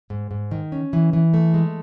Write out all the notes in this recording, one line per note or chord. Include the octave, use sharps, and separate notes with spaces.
G#2
G#2
D#3
C#4
E3
E3
A3
G#3